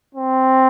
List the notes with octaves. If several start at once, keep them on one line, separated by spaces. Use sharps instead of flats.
C4